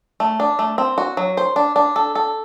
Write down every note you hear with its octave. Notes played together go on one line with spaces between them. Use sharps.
A3
D4
A3
C4
F#4
F#3
C5
D4
D4
A4
A4